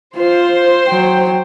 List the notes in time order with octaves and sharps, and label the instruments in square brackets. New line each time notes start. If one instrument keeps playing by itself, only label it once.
[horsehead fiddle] F4 [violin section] C5
[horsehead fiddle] F#3 G5